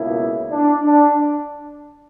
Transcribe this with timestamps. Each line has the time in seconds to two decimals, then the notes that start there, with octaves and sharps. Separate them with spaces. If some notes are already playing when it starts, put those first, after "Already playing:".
Already playing: C#2 B2 A#3 E4
0.51 D4
0.85 D4